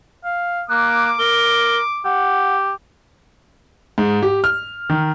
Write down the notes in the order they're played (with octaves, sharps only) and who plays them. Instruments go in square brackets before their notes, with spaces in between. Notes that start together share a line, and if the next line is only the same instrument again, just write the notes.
[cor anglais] F5
[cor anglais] A#3 [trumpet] D6 [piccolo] F#6
[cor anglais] A#4 [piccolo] G7
[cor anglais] G4 [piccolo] F#5
[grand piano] G#2
G4
F6
D#3